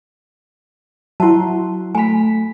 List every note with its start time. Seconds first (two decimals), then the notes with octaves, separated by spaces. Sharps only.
1.20 F#3 E4 E5 F#5 A5 C6
1.95 A3 G#5 B5 B6